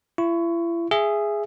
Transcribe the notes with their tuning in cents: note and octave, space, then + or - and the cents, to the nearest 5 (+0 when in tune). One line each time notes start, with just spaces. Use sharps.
E4 +40 C#6 +0
G#4 -5 E5 +20